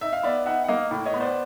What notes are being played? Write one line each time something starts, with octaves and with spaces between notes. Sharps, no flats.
D#4 E5
F5
B3 D5 E5
D#4 E5 F#5
F#5
A#3 D#5 F5
A2
C#5 D#5
B3
C5 D5